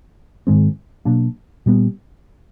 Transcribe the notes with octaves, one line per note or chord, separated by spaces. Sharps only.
G#2 D#3 G#3 C4
B2 F#3 A#3 D4
A#2 G3 B3